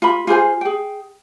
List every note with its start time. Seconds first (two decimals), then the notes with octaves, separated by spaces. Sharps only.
0.02 F4 B5
0.27 F4 G#4 C5 G#5
0.61 G#4 G5